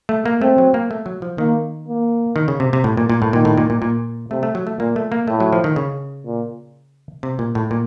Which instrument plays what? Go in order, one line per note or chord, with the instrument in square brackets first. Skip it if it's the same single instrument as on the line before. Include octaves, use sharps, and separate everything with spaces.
[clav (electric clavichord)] A3
A#3
[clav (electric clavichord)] A3 [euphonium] C4
[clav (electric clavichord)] F#3
A#3
A3
F#3
F3
[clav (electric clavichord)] D#3 [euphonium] A#3
[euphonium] A#3
[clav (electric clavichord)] D#3
C#3
C3
C3
A2
A#2
A#2
A2
[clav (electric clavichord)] A#2 [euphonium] D#3
[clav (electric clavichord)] A2
A#2
A#2
A#2
[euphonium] C3 [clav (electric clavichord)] A3
[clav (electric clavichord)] A3
F#3
A3
[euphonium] A#2 [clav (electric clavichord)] A#3
[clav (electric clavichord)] A3
A#3
[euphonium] A2 [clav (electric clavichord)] A3
[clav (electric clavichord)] F#3
F3
D#3
C#3
[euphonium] A#2
[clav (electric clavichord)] C3
A#2
A2
A#2